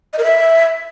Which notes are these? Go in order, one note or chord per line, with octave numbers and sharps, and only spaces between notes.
D#5
A#4
E5